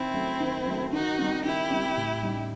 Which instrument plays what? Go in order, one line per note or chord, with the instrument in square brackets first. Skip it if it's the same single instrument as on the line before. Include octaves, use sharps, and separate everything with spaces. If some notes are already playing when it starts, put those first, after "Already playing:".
Already playing: [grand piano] D#3 [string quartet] C4 E4
[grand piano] F#3 A3
D#3
F#3 A3
[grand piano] D#3 [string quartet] D#4 F#4
[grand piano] G3 C4
[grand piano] D#3 [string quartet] E4 G4
[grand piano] G3 C4
A2
G3 D#4